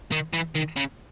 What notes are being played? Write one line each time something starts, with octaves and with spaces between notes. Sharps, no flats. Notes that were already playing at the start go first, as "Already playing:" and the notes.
D#3
E3
D#3
C#3